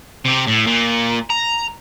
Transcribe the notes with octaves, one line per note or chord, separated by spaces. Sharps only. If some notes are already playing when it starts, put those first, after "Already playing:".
C3 G4
A2
A#2
A#5